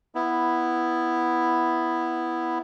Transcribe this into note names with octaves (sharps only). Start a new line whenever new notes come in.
B3 E4